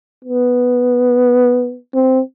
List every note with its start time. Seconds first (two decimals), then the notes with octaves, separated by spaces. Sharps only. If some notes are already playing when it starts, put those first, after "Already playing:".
0.25 B3
1.95 C4